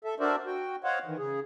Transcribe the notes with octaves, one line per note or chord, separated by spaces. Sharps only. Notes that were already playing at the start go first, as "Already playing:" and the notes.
A4 E5
D4 F#4 A#4 C5 D5 E5
F#4 G5
C5 C#5 D#5 F5 F#5
D#3 E3
C#3 G#4